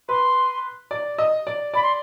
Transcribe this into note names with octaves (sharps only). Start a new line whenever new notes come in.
B4 C6
D5
D#5
D5
D5 B5
C6